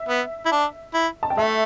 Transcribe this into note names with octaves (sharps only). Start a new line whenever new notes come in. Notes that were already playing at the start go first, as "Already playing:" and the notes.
Already playing: E5
B3
E4
D4
E4
A5
G5
A3 E5